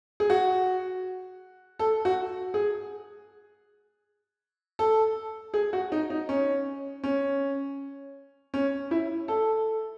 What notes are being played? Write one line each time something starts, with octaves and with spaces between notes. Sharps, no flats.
G#4
F#4
A4
F#4
G#4
A4
G#4
F#4
D#4
D#4
C#4
C#4
C#4
E4
A4